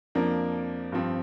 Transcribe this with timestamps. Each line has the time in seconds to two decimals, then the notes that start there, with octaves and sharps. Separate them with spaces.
0.15 F2 F3 A#3 D4 A#4
0.92 G2 F3 C4